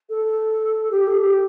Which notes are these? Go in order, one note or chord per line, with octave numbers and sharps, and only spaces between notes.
A4
G4
A4
G4